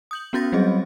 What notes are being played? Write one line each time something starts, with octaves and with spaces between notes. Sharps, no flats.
D#6 G6 F#7
B3 C#4 F#4 G6 A6 A#6
F#3 G3 C4 G#4 D#5